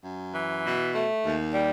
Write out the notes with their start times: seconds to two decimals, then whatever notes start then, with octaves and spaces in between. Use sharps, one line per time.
0.04 F#2
0.35 E3
0.65 B2
0.95 A3
1.25 D#2
1.54 G3